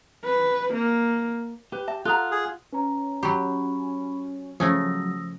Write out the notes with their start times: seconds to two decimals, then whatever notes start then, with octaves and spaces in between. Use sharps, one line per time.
0.24 B4
0.74 A#3
1.72 G4 B4
1.88 E5 A5
2.05 F4 A4 F#5 A#5 D#6 F#6
2.31 G#4
2.72 C#4 B4 A#5
3.23 F#3 G4 B5 C#6
4.60 C#3 F3 F#3 A3 C#4 D#6 E6 A#6